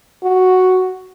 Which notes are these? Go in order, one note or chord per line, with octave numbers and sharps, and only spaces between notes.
F#4